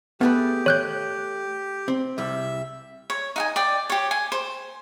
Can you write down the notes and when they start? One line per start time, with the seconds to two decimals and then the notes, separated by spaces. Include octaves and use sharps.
0.21 A3 B3 G4 G#4 B4
0.66 C#5 F#6 G6
1.88 C4
2.18 C2 G3 E5
3.10 C#5
3.36 D#4 F#5 G#5
3.56 D5 G5
3.90 G4 C#5
4.11 G#5
4.32 C5